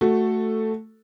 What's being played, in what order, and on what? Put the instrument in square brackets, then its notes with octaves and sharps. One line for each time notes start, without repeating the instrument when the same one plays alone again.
[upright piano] A3 F#4 A4